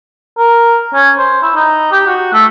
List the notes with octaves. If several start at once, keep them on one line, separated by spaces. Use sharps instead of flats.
A#4
C#4
C5
E4
D#4
G4
F#4
A3